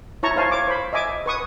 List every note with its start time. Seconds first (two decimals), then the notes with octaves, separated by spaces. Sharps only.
0.23 E4 C#5 A5 A#5 C#6
0.36 E4 C5 C#5 F5 G#5 A5
0.51 C#5 D6
0.67 C5 B5
0.93 D#5 E5 G#5 D6
1.26 B4 C#6 D#6